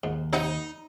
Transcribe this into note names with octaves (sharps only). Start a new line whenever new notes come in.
D#2 G#2
C3 C4 D#4 F#5